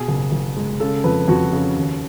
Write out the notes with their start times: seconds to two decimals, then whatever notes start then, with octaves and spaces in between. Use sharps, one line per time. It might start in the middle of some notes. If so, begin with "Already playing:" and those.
Already playing: B2 G#4
0.08 F#1
0.32 F#1
0.56 G#3
0.80 C#3 A4
1.04 F2 B4
1.28 F2 F#4
1.53 C#3
1.76 D#2